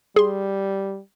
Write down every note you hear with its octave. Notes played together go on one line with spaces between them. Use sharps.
G3 G#4 C6